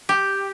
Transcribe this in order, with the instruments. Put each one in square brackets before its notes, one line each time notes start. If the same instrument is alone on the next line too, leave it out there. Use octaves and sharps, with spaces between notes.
[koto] G4